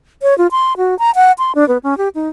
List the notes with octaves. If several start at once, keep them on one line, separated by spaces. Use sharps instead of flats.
C#5
F4
C6
F#4
A#5
F#5
C6
D4
B3
C#4
G4
D#4